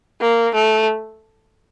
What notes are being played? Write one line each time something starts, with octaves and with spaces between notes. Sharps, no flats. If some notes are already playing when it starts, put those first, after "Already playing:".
A#3
A3